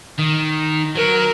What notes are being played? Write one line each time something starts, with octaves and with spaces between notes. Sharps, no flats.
D#3
F#3 F#4 A#4